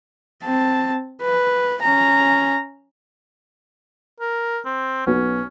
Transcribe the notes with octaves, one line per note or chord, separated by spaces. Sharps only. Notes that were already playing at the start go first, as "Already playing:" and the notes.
C4 A5
B4
C#4 A#5
A#4
C4
B1 B3 C#4